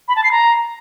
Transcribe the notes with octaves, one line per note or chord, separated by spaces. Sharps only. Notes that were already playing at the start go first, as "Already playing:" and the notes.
B5
A5
C7
A#5